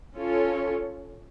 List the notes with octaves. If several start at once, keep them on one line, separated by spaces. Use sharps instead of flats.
C#4 F4 A4 C#5